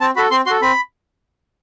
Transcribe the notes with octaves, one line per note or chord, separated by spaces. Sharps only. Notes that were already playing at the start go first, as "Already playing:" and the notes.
C4 A5
F#4 A4 B5
C4 C6
F#4 A4 C6
C4 B5